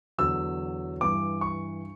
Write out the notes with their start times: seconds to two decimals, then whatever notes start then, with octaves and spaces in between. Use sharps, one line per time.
0.18 E2 D3 F#3 E6
1.01 G2 E3 D6
1.41 C#6